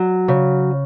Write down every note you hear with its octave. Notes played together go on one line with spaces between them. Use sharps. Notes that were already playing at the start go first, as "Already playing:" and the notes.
Already playing: F#3
C#3